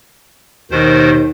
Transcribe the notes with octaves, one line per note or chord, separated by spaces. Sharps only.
D#2 B2 D#3 C5